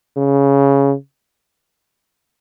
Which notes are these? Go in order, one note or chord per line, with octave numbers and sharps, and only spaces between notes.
C#3